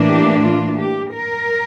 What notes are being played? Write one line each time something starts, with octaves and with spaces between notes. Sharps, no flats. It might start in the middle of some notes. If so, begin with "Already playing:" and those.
Already playing: A2 E3 A#3 D4
G4
F4
G4
A#4